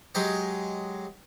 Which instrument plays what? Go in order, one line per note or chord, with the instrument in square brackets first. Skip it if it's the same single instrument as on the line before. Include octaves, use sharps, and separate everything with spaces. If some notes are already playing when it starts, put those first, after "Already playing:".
[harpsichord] F#3 G#3 G4 D#5